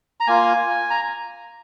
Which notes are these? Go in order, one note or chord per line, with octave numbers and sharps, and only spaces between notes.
A#5
A#3 F4 G#5
A#5